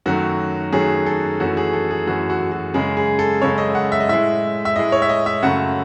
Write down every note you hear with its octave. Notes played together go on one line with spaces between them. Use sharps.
F#2 D#3 F#3 A3 F#4
F#2 D#3 F#3 A3 G#4
A4
F#2 E3 A3 F#4
G#4
A4
G#4
F#2 E3 A3 F#4
F#4
F#4
F#2 C#3 G#3 G#4
G#4
A4
F#2 C#3 G#3 C#5
D#5
F#5
E5
D#5
A2 G#3 E5
E5
A2 G#3 D#5
C#5
E5
D#5
E5
F#2 C#3 F#3 A3 F#5